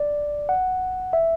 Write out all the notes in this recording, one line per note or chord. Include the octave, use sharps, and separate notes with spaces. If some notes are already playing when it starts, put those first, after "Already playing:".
Already playing: D5
F#5
E5